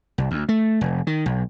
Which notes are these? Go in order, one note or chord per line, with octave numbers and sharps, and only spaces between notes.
C2
D2
A3
F1
D#3
B1